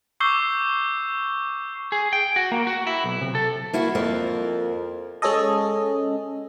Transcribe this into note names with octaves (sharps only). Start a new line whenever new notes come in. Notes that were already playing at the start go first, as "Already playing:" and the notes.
C#6 D6 E6 G6 C7 G7
G#4
G5
F#4
A#3
F#4
E4
B1
C3
A4
A#3 E4 F#4
F2 A#3
G#3 C#4 G#4 A4 D#5